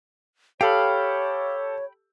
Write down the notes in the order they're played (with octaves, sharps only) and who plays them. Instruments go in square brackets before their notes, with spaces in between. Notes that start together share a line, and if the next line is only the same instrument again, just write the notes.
[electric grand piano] G4 A4 [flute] C#5 [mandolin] F5 [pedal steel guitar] G5 B5